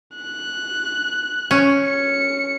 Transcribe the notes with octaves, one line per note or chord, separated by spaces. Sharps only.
F#6
C#4
C#7